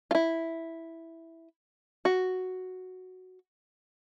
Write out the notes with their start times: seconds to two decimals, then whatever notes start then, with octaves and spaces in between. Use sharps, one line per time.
0.11 F4
0.15 E4
2.05 F#4